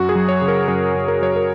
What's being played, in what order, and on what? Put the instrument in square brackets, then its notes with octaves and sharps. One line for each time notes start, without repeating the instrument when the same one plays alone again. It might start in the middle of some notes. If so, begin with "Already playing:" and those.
Already playing: [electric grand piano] F#2 F#4
G#4
F#3
C#5
C#3
A#4
F#2 G#4
F#2
A#4
F#3 C#5
A#4